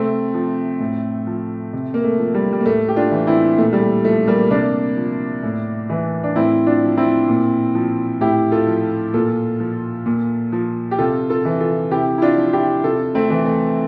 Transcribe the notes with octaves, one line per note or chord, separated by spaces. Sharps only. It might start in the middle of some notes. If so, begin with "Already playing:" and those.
Already playing: C3 A3 C4
F3
A2
F3
C3
A#3
A3
F3
G3
G3
A#3
A2 A3
G4
D4 F4
E3
C4 E4
A#2 A3
G3
A3
F3 A3
G3 A#3
C3 A#3 D4
F3
A2
E3
D4
A2 C4 E4
D4 F4
F3
C4 E4
A#2
F3
A2 E4 G4
F4 A4
F3
A#2 F4 A4
F3
A#2
F3
G4
C3 F4 A4
F4 A4
E3
F4 A4
C3 E4 G4
E4
D4 F4
F3
F4
E4 G4
C3 F4 A4
A3 C4
E3
A3